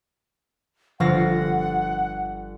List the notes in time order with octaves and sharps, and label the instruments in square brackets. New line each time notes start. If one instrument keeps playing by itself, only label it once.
[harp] G1 F5 A#6 [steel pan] F3 [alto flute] F#5